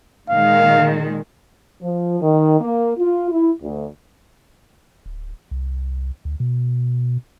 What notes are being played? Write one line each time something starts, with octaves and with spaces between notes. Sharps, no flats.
A#2 D#3 G#3 F5
F3
D#3
A#3
F4
E4
D2
D1
C2
D2
B2